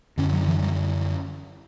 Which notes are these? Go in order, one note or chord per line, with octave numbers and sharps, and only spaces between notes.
F#2 D3 C#4
F#3
E3
G3